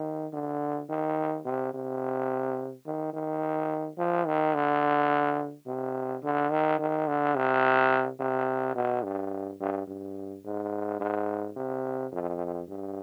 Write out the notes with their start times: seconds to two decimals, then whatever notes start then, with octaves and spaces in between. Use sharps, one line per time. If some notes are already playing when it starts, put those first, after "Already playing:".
Already playing: D#3
0.33 D3
0.89 D#3
1.45 C3
1.74 C3
2.86 D#3
3.13 D#3
3.98 F3
4.27 D#3
4.54 D3
5.67 C3
6.23 D3
6.50 D#3
6.79 D#3
7.07 D3
7.36 C3
8.20 C3
8.75 B2
9.03 G2
9.60 G2
9.87 G2
10.45 G#2
11.00 G#2
11.56 C3
12.12 F2
12.68 G2